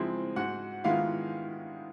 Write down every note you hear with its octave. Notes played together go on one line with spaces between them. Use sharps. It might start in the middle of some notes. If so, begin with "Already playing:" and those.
Already playing: C#3 F3 G#3 C4 E4
G#2 F#4 F#5
D#3 G#3 B3 E4 F4 F5